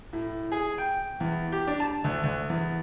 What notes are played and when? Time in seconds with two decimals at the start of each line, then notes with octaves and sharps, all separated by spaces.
0.13 A2
0.52 G#4
0.78 G5
1.20 E2
1.52 G4
1.67 D4
1.80 A5
2.04 D2
2.24 D2
2.49 E2